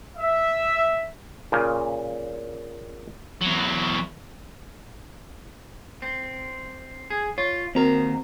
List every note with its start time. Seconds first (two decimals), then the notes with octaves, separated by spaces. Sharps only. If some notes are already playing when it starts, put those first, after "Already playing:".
0.17 E5
1.52 A#2 C#3
3.41 E2 F#3
6.02 C4
7.10 G#4
7.38 F4 C#5
7.75 D#2 C4 F#4 A#4 A#5